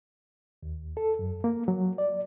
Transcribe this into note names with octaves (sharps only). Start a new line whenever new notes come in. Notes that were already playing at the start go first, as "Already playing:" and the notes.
D#2
A4
F#2
A#3
F#3
D5